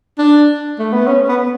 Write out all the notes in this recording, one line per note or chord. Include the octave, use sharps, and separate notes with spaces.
D4
A3
B3
C#4
B3